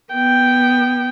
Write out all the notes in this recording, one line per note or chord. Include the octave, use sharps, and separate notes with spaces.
B3 G5